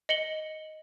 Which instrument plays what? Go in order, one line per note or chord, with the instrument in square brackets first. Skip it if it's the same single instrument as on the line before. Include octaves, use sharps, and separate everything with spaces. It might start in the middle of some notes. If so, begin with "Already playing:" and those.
[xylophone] D#5 C#7 F#7 G7